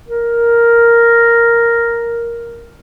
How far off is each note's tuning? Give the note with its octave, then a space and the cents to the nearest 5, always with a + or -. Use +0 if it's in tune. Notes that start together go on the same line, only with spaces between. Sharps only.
A#4 +0